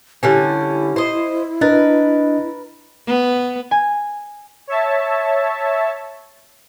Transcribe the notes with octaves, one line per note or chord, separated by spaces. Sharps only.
D3 G3 C#4 E4
C5 D#5
D4 A#4 B4 D#5 A6
B3
G#5
C#5 E5 A5